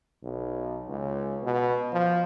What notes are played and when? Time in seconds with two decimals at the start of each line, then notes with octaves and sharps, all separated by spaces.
0.23 B1
0.89 C#2
1.43 B2
1.92 F3